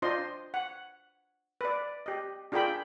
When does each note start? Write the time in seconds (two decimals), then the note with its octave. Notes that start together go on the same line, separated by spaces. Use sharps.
0.02 D4 F4 C5 D#5 C6
0.54 F#5
1.61 B4 D5
2.06 G4 D#5
2.52 D4 F4 G#4 A#4 G5 B5